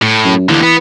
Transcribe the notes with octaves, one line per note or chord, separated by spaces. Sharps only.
A2
F#2
D#2 D3 E3
B3